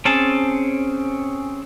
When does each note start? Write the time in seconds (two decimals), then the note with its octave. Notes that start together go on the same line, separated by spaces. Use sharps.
0.05 C4 C#4 G#4 A5